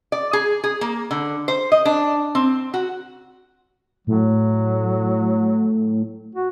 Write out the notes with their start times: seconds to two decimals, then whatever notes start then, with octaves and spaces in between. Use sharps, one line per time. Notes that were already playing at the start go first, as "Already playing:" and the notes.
0.12 D5
0.33 G#4
0.64 G#4
0.81 A#3
1.11 D3
1.48 C5
1.72 D#5
1.85 D4
2.35 C4
2.74 F#4
4.07 A2 F#3
6.35 F#4